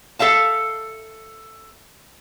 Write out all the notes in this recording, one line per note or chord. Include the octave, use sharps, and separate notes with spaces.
A4 E5 F5 A5